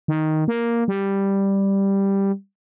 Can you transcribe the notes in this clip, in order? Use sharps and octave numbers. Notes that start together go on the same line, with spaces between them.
D#3
A#3
G3